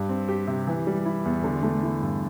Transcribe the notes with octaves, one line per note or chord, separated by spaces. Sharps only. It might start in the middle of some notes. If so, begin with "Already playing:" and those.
Already playing: G2 G3
C4
G4
C3
E3
G3
E4
E2
D3
A3
E4
G2